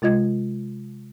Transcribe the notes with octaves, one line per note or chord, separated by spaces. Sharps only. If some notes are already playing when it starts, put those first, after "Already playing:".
C3 G#3 F4 D#5 G#6